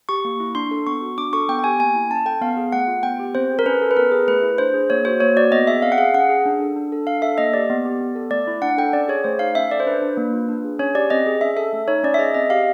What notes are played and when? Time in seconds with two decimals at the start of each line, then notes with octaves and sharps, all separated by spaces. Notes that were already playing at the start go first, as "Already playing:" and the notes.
0.09 G4 C#6
0.25 A#3
0.40 E4
0.55 D4 C6
0.71 A4
0.87 B3 C#6
1.02 F#4
1.18 D4 D6
1.33 A4 C#6
1.49 B3 G5
1.59 G5
1.64 G4 G#5
1.79 A#3 G#5
1.95 E4
2.10 C#4 A5
2.25 A4 G5
2.41 B3 F5
2.57 G#4
2.72 A3 F#5
2.87 F4
3.03 B3 G5
3.19 G4
3.35 C4 C5
3.51 G#4
3.59 A#4
3.66 C#4 B4
3.82 A4
3.91 B4
3.97 B3 A#4
4.12 G#4
4.27 A3 B4
4.43 E4
4.58 D4 C5
4.74 G#4
4.90 A#3 C#5
5.05 F#4 C5
5.20 A#3 C#5
5.36 F#4 D5
5.52 B3 D#5
5.67 G#4 E5
5.82 C4 F5
5.92 F#5
5.98 G#4 F5
6.14 C#4 F#5
6.29 G#4
6.46 D4
6.60 A4
6.76 D4
6.92 A4
7.07 D4 F5
7.22 A4 E5
7.38 A#3 D#5
7.54 G4 D5
7.70 B3
7.85 G4
8.01 B3
8.16 A4
8.31 A3 D5
8.47 E4
8.62 D4 F#5
8.78 A4 G5
8.93 C#4 D5
9.08 G#4 C#5
9.24 A3 C5
9.39 D#4 F5
9.55 C#4 E5
9.71 A4 D5
9.80 C5
9.87 D4 B4
10.02 D4
10.17 A#3
10.33 F4
10.48 D4
10.64 G#4
10.79 C#4 C#5
10.95 G4 D5
11.10 C4 D#5
11.27 G#4
11.41 C#4 E5
11.57 A4 E5
11.73 A3
11.88 D#4 C#5
12.03 C#4 D5
12.14 E5
12.19 G#4 D#5
12.34 C4 D#5
12.50 G4 F5